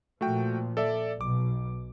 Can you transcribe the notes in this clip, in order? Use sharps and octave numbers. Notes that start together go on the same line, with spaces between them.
A#2 F3 A3 F#4 G5
A4 D5 E5
B1 B2 D6